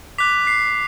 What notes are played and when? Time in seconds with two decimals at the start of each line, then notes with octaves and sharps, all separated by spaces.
0.18 D6 F#6 B6
0.47 C7